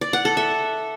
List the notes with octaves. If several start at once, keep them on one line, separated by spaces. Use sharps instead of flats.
D5
F#5
A4
E5